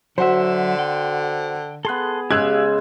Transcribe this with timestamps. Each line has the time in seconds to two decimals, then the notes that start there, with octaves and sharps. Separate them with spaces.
0.18 D3 F#3 F#4 C5 E5
0.79 G5
1.85 B3 G#4 A4 C6 F#6
2.31 C#3 G#3 G4 G#4 F5 E6 F#6 G#6